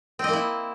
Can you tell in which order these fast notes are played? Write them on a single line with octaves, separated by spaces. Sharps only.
C4 D#5 A#3 E4